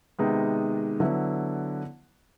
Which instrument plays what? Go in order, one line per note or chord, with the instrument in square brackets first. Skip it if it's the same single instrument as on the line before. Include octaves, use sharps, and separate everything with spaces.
[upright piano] C3 D#3 G#3 B3 D#4
D3 F#3 B3 E4